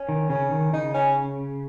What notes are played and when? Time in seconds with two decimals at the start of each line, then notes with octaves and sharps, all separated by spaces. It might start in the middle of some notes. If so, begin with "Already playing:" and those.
Already playing: C#4
0.09 D#3
0.30 C#3 C#4
0.51 D#3
0.73 C#3 D#4
0.94 C#4